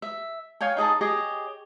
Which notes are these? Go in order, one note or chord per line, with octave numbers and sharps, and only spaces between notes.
E5
C#5 F5 G5 G#5
D#4 G#4 D#5 A5
G4 G#4 C#5 D#5